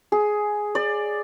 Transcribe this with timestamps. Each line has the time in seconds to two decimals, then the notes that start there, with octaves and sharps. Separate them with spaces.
0.12 G#4
0.75 D5